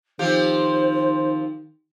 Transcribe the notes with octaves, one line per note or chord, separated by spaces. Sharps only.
D#3 F3 C4 G4 C5